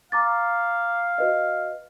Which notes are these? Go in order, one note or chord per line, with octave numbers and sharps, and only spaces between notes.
F5 A#5 D6 A6
F#4 B4 D#5